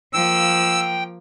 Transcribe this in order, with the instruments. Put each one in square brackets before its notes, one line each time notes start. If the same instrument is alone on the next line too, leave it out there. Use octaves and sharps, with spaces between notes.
[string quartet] F3 A#3 [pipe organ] G5 [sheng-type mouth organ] E6